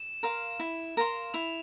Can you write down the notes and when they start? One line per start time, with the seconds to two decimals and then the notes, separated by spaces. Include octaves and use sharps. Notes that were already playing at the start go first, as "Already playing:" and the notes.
Already playing: E7
0.23 A#4 F5 C6
0.59 E4
0.97 A#4 F5 C6
1.34 E4 F7